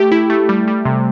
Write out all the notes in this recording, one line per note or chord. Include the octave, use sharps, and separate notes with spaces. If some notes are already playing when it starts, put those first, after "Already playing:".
Already playing: A3 G4
E4
A3
G3
G3
C3